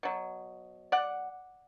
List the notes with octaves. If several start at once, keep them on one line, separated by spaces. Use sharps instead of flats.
B2 F#3
D5 F#5